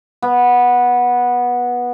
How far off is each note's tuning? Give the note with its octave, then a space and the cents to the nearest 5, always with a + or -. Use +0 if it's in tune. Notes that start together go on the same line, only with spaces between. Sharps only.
B3 -15